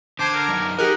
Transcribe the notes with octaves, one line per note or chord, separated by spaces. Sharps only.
D3 C5 A5 D6 G#6
A#4
F#2 F#3 D#4
D#4 G4 G#4 A#4 F#5